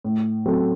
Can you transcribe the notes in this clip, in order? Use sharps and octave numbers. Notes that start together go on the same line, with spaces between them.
A2
F#3 C4 F#4 A4